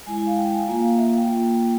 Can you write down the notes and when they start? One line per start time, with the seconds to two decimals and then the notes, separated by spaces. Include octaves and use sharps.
0.06 G#3 E4 G#5
0.17 G#5
0.27 F5
0.37 G5
0.53 G#5
0.67 A#3 F4 G#5
0.82 F5
0.97 E5
1.17 G5
1.28 A#3 F4